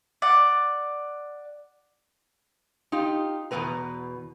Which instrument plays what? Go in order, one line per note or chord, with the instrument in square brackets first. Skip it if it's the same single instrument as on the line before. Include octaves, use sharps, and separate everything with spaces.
[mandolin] D5 F#5
[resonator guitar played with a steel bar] D#4 F4 G4
E2 B2 G#3 C#4 B4 A#5